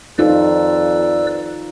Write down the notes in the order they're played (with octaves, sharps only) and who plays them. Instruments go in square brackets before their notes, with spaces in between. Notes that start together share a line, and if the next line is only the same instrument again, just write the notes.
[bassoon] F2 [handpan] D#4 F4 [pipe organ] B4 D5 E6